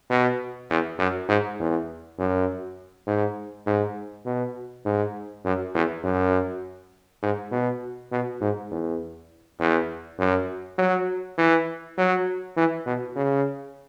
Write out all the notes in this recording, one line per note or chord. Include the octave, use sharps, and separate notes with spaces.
B2
E2
F#2
G#2
E2
F#2
G#2
G#2
B2
G#2
F#2
E2
F#2
G#2
B2
B2
G#2
E2
E2
F#2
F#3
E3
F#3
E3
B2
C#3